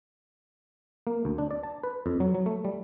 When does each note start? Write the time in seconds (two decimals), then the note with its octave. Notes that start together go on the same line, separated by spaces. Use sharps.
1.07 A#3
1.25 D2
1.38 D4
1.51 D5
1.63 A5
1.83 B4
2.06 F2
2.20 F#3
2.35 F#3
2.46 A3
2.65 G3